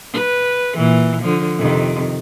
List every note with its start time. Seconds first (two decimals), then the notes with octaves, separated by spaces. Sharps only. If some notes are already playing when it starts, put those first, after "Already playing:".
0.13 B4
0.76 A#2 E3
1.23 D3 F3
1.58 F2 C3 D#3